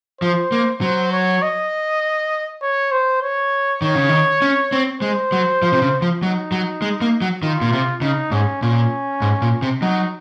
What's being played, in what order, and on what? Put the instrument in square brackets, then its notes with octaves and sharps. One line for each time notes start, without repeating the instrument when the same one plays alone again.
[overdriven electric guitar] F3 [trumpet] C5
[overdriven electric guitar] A#3
[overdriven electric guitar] F#3 [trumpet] C5
[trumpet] C#5
D#5
C#5
C5
C#5
[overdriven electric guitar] D#3 [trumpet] C#5
[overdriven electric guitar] C#3
D#3
C#4
C4
[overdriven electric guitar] G#3 [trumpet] C5
[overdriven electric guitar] F#3
F3
C3
C#3
F3
[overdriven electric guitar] F#3 [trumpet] D#4
[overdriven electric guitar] F#3
G#3
A#3
F#3
[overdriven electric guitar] D#3 [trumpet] F4
[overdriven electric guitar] A#2
C3
[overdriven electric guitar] C#3 [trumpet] D#4
[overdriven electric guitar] G#2 [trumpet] C#4
[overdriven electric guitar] A#2 [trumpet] C#4
[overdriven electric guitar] G#2
A#2
C3
[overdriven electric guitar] F#3 [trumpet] D#4